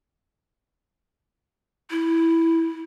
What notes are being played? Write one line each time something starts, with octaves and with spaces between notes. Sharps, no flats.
E4